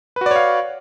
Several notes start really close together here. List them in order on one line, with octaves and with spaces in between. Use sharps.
B4 F#4 D5 C#5 F5